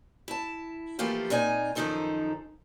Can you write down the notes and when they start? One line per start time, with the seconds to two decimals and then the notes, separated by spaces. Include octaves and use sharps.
0.28 E4 A5
0.99 E3 F3 A3 A#3 F4 G4
1.30 A#2 C4 D#4 C#5 G#5
1.75 F#2 D#3 F3 D#4 A4 C5